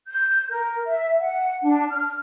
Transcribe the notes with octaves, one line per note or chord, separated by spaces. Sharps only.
G6
A#4
E5
F#5
D4
F6